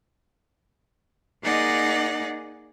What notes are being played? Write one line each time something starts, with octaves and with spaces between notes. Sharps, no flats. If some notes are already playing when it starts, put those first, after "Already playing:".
A#3 D#4 G#4 D5 D#5 F#5